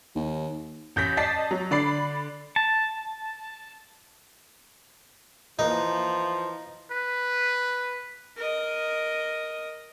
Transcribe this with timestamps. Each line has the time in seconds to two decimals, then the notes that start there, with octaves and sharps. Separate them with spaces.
0.16 D#2
0.96 A1 G6 A#6 B6
1.17 D5 D#5 A5 A6 B6 C7
1.51 F#3
1.71 D3 D5 B5 C7
2.56 A5
5.59 E3 F3 A#3 D#4
6.91 B4
8.37 A#4 D#5